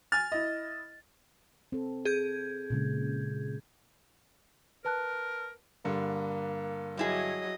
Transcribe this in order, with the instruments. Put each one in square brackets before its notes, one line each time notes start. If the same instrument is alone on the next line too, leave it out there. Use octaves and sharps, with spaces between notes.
[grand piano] G#5 F6 [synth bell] A6
[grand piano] E4 D#5
[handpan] C4 A4
[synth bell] G#4 G6 G#6
[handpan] A#2 C#3 G#3
[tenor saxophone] A#4 [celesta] B4 A5 F#6
[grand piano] G2 D3 [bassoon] A#3
[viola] F#3 D#5 [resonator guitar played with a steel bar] G3 E4 G#4